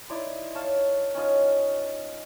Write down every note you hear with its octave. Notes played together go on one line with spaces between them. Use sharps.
D#4 E4 D5 C6
C#5 F5 A5
C#4 D#4 F4 D#5